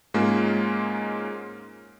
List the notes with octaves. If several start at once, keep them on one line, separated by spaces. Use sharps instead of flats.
G#2 G#3 A#3 C#4 F4